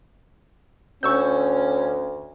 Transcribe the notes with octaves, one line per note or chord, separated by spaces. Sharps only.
D2 C#4 C#6 E6 G6